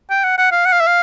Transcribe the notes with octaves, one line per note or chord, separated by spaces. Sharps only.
G5
F#5
F#5
F5
F#5
F5
E5
F5